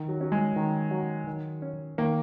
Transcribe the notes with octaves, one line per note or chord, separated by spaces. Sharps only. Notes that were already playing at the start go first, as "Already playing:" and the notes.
Already playing: D#3
F#3
F#3 C#4
G#3
D#3
F#3
D#3
C#4
D#3 A#3